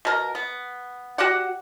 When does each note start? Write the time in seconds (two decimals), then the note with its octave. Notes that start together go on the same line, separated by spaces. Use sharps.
0.05 B2 A#4
0.35 B3
1.18 F#4 G4 D5 F#5